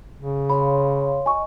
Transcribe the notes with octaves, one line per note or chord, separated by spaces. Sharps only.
C#3
C#5 F5 B5 C6
D#5 G#5 C#6